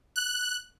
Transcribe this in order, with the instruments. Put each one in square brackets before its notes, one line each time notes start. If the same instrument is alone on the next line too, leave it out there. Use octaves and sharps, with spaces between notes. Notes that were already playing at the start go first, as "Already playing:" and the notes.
[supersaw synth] F#6